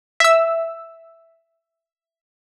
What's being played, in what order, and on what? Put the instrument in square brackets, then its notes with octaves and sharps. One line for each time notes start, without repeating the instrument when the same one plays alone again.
[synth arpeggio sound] E5 E6